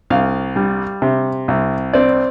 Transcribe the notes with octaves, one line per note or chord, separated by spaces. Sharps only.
C2 F5
G3
C3
C2
C4 D5